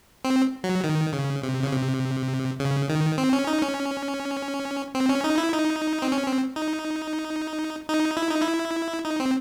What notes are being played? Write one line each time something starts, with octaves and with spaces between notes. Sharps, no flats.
C4
F#3
D#3
C#3
C3
C#3
C3
C#3
D#3
C4
C#4
D#4
C#4
C4
C#4
D#4
E4
D#4
C4
C#4
C4
D#4
D#4
E4
D#4
E4
D#4
C4